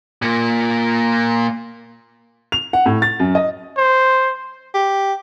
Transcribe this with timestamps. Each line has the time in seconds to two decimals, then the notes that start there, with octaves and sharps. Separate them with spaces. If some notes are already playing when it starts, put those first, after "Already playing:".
0.22 A#2 A#3
2.52 F7
2.73 F#5
2.86 A2
3.02 A6
3.20 F#2
3.35 D#5
3.77 C5
4.74 G4